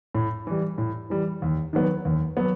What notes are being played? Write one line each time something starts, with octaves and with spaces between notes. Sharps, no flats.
A2
E3 G3
A2
E3 G3
D#2
D#3 F#3 B3
D#2
F#3 B3